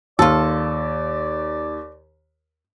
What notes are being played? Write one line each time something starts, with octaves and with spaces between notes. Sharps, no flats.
D#2 F4 A4 D5